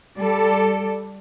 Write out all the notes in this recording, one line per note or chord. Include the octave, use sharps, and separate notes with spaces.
G3 A4 D5